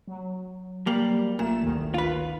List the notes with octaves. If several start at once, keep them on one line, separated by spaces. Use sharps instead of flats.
F#3
G3 A#3
A1 A#2 A3 E7
G1 D2 D#3
F4 B4